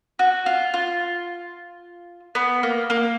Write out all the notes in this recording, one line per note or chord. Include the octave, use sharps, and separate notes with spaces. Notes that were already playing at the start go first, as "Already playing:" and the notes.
F#4
F4
F4
B3
A#3
A#3